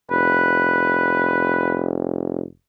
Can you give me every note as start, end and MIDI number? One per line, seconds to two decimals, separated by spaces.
0.11 2.44 29
0.11 1.87 71